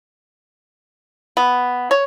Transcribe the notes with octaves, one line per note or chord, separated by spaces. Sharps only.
B3
C#5